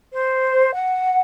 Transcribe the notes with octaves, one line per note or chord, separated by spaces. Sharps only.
C5
F#5